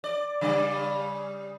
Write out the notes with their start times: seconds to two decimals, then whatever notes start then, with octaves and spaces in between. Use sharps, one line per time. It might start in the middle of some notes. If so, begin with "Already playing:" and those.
0.04 D5
0.41 C#3 G3 D5